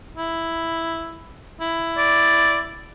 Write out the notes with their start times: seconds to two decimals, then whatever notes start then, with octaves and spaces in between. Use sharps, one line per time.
0.18 E4
1.61 E4
1.98 D5